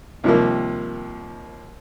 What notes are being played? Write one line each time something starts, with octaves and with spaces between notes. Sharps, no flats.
D#2 C3 F3 G3 A#3